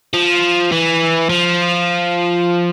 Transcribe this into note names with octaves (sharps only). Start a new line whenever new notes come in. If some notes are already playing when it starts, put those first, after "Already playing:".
F3
E3
F3